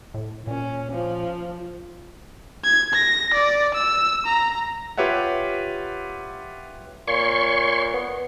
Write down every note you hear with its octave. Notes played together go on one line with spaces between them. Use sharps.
A2
A#2 C#4
F3
G#6
A#6
D5
E6
A#5
F4 G4 B4 C#5 E5 F#5
A#2 C#5 C6 C#6
B3